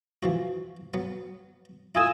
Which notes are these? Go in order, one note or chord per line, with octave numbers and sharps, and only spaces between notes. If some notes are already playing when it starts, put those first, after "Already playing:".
E3 F3 F#4
F#3 B3
E4 F4 A4 G#5 D#6 E6